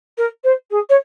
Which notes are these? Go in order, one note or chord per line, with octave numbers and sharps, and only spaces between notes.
A#4
C5
G#4
C#5